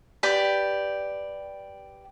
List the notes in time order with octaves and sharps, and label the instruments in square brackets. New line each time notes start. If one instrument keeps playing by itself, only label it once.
[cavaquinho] G4 B4 D5 G5